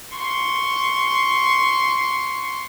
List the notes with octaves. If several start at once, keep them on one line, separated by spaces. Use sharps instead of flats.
C6 C#6